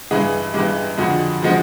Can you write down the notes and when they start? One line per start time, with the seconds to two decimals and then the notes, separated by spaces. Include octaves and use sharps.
0.11 G2 E3 G#3 G#4
0.54 G2 E3 G#3 G4
0.97 F2 D3 F3 G#3 F#4
1.42 D3 F3 G#3 F#4